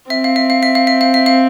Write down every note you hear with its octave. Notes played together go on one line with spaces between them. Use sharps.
C4 E5
F5
E5
F5
E5
F5
E5
F5
E5
F5